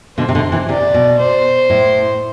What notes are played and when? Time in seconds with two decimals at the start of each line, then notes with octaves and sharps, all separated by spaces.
0.18 B2 D3 C5
0.29 C3
0.35 B2 D3
0.52 C3 E3
0.69 C3 D5
0.94 B2
1.19 C5
1.70 A2